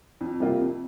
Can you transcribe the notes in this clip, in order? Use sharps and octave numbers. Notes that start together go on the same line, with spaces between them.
F2
C3 G3 A#3 F4
F2